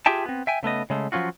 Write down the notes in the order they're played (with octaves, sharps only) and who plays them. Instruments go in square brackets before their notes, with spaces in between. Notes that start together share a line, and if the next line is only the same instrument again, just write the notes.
[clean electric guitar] F4 G4 G#4 E5 G5 A5
B3 C4
E5 G5 G#5
C#3 A3 B3 D#5
C#3 G#3 A3
F3 F#3 C#4 F4 F#4